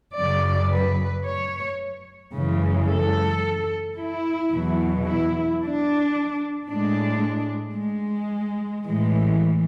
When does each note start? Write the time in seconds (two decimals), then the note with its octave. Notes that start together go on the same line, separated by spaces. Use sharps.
0.17 F#2 C#3 F#3 D5
0.72 B4
1.26 C#5
2.34 F#2 C#3 E3 G#3
2.89 A4
3.97 E4
4.52 E2 B2 F#3
5.06 E4
5.61 D4
6.69 A2 G#3 D4
7.78 G#3
8.86 A2 E3 G#3